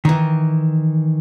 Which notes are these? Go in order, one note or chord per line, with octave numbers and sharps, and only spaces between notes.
D#3 E3